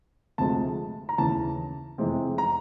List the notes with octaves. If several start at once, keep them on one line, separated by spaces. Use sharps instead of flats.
D2 C3 F3 G#3 A5
A#5
D#2 C#3 E3 A5
F2 C3 E3 G#3 C4
A#5